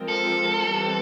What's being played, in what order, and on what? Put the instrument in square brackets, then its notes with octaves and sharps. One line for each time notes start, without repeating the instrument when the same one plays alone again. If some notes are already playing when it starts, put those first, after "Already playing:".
Already playing: [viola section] F3 G#3 C4 F4 A#4
[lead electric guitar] A4
[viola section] E3 G3 C4